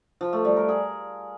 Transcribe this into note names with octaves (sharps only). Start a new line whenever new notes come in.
F3
A3
G3
A#4
G#4